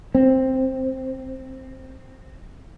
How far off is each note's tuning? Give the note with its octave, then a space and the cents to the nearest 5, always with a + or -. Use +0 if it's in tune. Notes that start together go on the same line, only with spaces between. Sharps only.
C4 +5